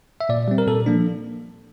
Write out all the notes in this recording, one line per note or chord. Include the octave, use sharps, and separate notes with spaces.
E5
A#2 D5
G3 C4
A#4
A#2 A4
F3 A#3 D4